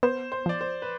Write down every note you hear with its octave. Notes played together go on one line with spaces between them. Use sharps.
B3 C5
C5
F3 D5
C5
B4